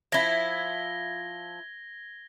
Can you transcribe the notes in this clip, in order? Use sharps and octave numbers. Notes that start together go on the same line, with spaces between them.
F3 E4 G#6 A#6 G7